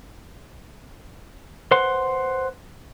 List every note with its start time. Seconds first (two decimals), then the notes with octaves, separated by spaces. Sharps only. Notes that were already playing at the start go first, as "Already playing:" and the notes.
1.71 B4 C5 F#5 C6